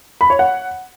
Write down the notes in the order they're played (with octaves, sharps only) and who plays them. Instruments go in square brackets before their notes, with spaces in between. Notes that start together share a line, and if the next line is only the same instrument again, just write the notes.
[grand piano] B5
C#5
F#5